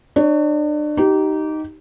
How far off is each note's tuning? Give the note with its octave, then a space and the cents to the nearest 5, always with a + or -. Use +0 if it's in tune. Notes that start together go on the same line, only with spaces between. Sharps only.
D4 +35 C#5 +15
D#4 +0 G4 -25